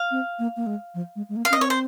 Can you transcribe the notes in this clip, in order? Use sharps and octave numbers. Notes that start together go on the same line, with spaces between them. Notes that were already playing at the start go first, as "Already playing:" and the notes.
Already playing: F5
C4
A#3
A#3
G#3
F3
G#3
G#3
A#3
F5
C#4
D#5
C4 C#5
C5